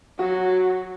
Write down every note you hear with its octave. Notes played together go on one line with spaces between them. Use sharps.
F#3 F#4